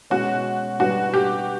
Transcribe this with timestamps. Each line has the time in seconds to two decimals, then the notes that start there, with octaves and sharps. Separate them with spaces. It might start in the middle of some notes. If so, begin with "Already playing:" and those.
0.10 B2 G#3 C#4 F#4
0.79 B2 G3 B3 D4 F#4
1.14 G4